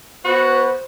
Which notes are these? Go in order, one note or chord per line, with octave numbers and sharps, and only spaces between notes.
B3 F#4 B4 C5 C#6